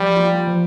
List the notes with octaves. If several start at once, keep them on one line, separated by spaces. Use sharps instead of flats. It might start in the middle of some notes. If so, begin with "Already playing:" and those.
Already playing: F3 G3
A#3 F4
F3